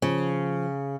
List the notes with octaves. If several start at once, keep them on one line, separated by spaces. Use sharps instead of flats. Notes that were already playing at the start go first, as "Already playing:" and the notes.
C#3 F3